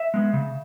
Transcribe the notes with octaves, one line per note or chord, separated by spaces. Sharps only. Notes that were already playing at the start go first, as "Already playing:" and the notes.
Already playing: E5
G#3 B3
C#3